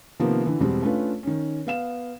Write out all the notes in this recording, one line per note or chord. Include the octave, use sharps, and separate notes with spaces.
C3 D#3 F3 A#3 B3
D3 E3
E2 B2 G3 G#3 C4
A3 C#4 D4 F4 B4
D#3 C#4
B3 F5 E7